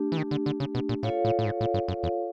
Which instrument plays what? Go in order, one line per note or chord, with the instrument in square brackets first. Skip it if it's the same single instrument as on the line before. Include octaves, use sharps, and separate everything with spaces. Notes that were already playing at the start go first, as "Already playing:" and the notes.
Already playing: [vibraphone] A3 D4 G4
[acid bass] E3
D#3
D3
D3
C#3
B2
A#2
[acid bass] A2 [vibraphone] F4 A4 C#5 F5
[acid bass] A2
A2
G#2
A2
G2
F#2
E2